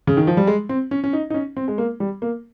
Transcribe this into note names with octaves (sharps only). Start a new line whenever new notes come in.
C#3
D#3
F3
G3
G#3
C4
C#4
C#4
D#4
D#4
C#4
C4
G#3
A#3
G3
A#3